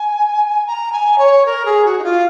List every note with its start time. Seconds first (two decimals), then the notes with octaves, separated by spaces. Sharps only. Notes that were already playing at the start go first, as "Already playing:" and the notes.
Already playing: G#5
0.66 A#5
0.91 G#5
1.18 C#5
1.45 A#4
1.65 G#4
1.84 F#4
1.98 D#4
2.03 F4